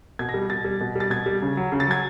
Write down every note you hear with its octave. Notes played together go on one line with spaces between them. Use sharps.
B2 G#6
A#6
G3
B2 A6
G3
B2
G3 A6
B2 G#6
G3
C#3
F#3
C#3
A6
F#3 G#6